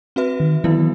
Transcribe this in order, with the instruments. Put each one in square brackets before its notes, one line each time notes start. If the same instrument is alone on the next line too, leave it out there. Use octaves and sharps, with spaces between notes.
[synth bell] C4 F#4 B4 E5
[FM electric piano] D#3
[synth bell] D#3 F#3 B3 E4 [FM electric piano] E3